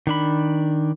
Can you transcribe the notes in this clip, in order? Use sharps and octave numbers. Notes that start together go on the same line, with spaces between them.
D#3 D4 B5